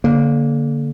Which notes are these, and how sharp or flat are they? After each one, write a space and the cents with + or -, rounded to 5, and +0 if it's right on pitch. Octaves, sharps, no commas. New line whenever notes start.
D3 -25 A#3 +0